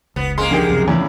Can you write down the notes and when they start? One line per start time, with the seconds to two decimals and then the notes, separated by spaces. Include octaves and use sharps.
0.16 F1 C#2 B3
0.38 G#3 A#3 C6
0.51 D3 D#3 F3 G4
0.68 C#2 F#2 C3
0.88 E2 A2 C#3